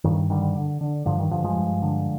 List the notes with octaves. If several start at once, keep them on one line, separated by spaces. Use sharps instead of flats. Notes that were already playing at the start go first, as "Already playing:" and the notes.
G2 D#3
D3 D#3 G3
D3
D3
G2 D3 F3
D#3
G2 D3 F3
F3 G#3
G2
D3